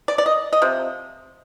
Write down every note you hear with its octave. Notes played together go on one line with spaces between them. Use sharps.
D5
D5
D#5
D#5
C3 F3